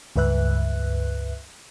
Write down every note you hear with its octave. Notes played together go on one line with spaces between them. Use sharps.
C#2 G2 B4 E5 F#6